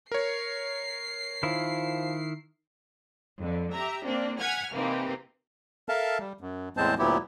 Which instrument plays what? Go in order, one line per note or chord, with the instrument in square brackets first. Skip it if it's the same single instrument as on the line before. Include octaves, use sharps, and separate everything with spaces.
[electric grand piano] A#4 C#5 [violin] C7
[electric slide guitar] D#3 E4 [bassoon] F3
[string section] F2 D3
G4 E5 A#5
A#3 C4 D4
F#5 G#5 F6 G#6 B6
C3 E3 A#3 C4 D#4 G4
[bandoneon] A4 A#4 E5 F5 A5
G3
F#2
E2 A2 G#3 C4 C5 A5
D2 A#2 F#3 B3 E4 G4